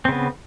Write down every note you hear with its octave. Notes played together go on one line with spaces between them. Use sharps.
C#3 B3 C4